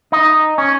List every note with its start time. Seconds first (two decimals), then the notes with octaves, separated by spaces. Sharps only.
0.12 D#4
0.58 C#4